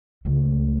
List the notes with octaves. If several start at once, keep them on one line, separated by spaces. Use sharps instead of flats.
C#2 A3